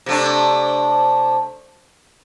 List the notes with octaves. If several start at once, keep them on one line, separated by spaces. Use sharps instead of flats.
C3 A3 D4